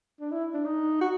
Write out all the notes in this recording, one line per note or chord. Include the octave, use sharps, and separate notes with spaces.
D4
E4
D4
D#4
F#4